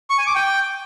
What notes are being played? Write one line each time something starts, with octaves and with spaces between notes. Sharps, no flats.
C#6
G#5
D6
G5